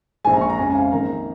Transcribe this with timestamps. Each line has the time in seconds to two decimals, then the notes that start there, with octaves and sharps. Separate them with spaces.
0.24 A#1 A#2 G#3 G#5
0.33 A#5
0.41 C#6
0.50 A#5
0.58 F2 C#3 G#3 C#4 G#5
0.70 G#5
0.75 F5
0.92 F2 D#3 A#3 A#5